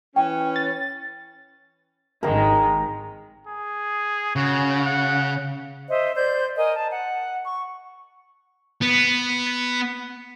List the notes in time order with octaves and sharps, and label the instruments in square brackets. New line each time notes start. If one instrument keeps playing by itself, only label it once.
[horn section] E3 C#4 [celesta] G5
[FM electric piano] A6
[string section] G#1 D#3 G#3 [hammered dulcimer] A#4 G5
[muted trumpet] G#4
[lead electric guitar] C#3 [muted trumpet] F#4
[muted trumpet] F#5
[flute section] C5 D#5 E5
C5 D5 G6
A#4 D#5 G#5
A5
F#5
C#6
[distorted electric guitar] B3